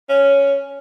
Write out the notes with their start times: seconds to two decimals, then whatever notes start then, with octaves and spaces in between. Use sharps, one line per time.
0.09 C#4